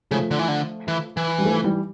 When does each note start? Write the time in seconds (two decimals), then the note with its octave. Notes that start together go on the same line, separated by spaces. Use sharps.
0.11 C#3 F3 A3
0.31 D3
0.39 E3
0.48 D3
0.88 E3
1.17 E3
1.38 G3
1.45 F3 A3
1.63 E3 G3